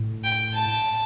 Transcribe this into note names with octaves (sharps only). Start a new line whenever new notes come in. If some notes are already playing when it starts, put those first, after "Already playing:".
Already playing: A2
G5
A5